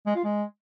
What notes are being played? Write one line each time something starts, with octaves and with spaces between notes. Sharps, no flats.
G#3
F4
G#3